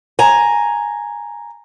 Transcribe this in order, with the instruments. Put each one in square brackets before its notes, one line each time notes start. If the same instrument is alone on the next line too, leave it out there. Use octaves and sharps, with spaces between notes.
[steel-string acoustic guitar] G#5 A#5